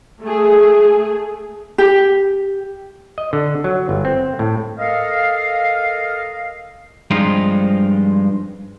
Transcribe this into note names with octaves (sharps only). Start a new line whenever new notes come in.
A3 G#4
G4
D#5
D3
F#3
G1
C4
A2
A4 A#4 D#5 F5
G2 F3 G#3 C4 D#4 F4